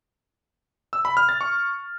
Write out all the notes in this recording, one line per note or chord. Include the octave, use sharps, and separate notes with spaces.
E6
B5
F6
A6
C#6